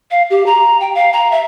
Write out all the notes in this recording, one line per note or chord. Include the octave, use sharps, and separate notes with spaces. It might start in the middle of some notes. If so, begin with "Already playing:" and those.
F5
G4
A#5
G5
F5
A#5
E5